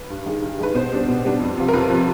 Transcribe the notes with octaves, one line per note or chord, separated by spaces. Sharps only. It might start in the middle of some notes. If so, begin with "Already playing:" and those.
Already playing: B4
G2
D#3 G#3
G2
D#3 G#3 B4
B2 C5
G3 B3 D4
B2
G3 B3 D4
F2
C3 F3
A#4
F2 B4
C3 F3